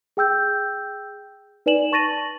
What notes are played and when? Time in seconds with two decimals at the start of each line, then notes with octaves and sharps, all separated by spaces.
0.17 G#4 G5 E6 G6
1.66 D#4 B4 D5 G#5 E7 F#7
1.92 A5 C#6 A6 A#6 D#7 F#7